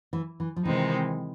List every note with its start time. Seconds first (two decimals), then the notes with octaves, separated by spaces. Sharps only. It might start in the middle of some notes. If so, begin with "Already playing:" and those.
0.13 E3
0.40 E3
0.56 F3
0.65 C3 D#3 E3 G#3 C4 D#4